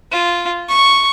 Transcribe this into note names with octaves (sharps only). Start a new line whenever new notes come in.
F4
C#6